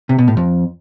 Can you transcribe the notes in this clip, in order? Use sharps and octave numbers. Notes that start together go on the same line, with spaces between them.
C3
B2
A2
F2